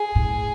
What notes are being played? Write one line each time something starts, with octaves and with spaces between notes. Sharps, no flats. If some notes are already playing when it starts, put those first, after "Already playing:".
Already playing: G#4
A2